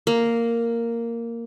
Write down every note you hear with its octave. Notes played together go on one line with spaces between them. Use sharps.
A#3